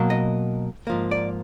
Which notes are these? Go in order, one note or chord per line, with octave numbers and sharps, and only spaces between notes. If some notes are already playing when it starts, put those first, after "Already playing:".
Already playing: B2 F#3 A#3
D#5
G#2 F3 A#3
D5